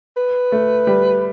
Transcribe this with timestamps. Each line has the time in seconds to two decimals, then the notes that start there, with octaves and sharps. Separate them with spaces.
0.17 B4
0.52 A3
0.87 G3